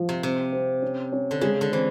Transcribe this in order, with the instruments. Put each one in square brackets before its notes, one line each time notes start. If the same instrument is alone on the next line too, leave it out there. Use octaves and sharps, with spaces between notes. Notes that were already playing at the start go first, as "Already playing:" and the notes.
Already playing: [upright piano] F3
[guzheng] C3
[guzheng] C3 [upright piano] C4
[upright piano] C4
C#4
C#4
[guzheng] D3
[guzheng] C#3 [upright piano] G#3
[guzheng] D3
[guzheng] E3 [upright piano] C4